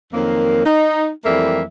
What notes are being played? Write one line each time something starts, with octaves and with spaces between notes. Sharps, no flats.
F2 D#3 F#3 A#3
D#4
F2 E3 G3 A3 A#3 E5